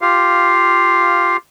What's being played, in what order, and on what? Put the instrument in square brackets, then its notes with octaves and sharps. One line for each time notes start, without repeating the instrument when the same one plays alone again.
[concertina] F4 G4 F5